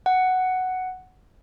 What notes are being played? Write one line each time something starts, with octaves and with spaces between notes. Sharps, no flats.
F#5